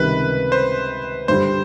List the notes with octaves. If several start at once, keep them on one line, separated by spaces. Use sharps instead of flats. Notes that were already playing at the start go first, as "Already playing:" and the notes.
Already playing: C#2 C3 D#3 G3 B4
C5
G2 D3 G3 C5